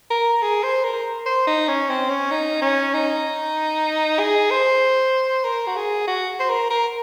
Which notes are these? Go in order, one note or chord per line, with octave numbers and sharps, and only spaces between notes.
A#4
G#4
C5
A#4
C5
D#4
C#4
C4
C#4
D#4
C#4
D#4
G#4
C5
A#4
F#4
G#4
F#4
C5
A#4
A#4